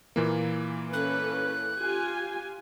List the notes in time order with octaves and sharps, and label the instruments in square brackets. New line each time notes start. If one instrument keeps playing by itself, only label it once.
[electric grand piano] A#2 E3 A#3
[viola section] C#4 A4 B4 [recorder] F#6
[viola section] F4 G4 G#5